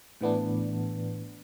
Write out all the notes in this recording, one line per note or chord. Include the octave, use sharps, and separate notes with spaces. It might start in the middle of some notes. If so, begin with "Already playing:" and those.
A2 E3 B3 D4